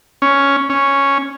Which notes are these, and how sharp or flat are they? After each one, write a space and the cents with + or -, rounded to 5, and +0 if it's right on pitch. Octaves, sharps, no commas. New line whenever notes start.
C#4 +5
C#4 +0